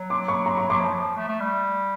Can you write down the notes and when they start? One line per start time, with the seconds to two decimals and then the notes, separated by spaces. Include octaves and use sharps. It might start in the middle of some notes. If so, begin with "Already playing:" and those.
Already playing: F#3
0.10 C6 D6
0.28 B5 C#6
0.46 A#5 C6
0.58 B5 C#6
0.69 F#3 C6 D6
0.81 F3
0.93 F#3
0.98 F3
1.16 A3
1.28 A3
1.40 G3